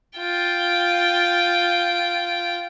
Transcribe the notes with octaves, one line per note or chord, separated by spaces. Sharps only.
F4 G5